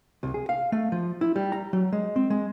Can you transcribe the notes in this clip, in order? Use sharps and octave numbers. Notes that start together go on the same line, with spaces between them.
C2
G#4
F5
A3
F3
E4
G3
A#5
F#3
G#3
C4
G#3